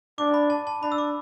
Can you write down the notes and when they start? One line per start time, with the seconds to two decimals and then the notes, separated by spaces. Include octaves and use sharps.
0.18 D4 D6
0.34 B5
0.50 A5
0.67 A5
0.82 D4 B5
0.92 E6
0.98 D6